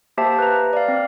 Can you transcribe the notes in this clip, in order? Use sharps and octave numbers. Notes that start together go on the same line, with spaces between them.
A#3 G4 C5 E5 G5 A5
B4 A#5
D5 F5
C4